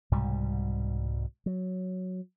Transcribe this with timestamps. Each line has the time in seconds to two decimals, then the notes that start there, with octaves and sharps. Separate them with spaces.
0.12 C2 G#2 B2 G3
1.46 F#3